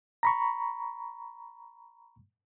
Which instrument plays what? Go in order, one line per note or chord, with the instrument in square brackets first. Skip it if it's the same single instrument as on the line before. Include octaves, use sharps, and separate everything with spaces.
[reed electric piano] A#5 B5 C#6